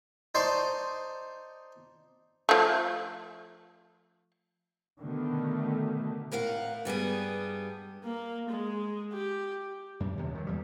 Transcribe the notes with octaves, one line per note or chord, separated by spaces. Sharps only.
D#4 C5 D5 A5 C6 C#6
F3 A3
B2 D3 D#3 A3 B3
A2 A#4 F5 F#5
G2 G3 B3 G#4
A#3
G#3
G4
F#2
D#2 C3
D#3 F#3
E2 G3